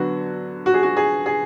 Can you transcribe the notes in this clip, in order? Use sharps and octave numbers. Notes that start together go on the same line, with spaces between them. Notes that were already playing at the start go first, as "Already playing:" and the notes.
Already playing: D3 F#3 B3 F#4
F#4
G#4
F#4
G#4
G#4